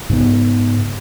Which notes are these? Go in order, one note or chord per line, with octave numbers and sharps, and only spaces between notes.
G#2 C#3 B3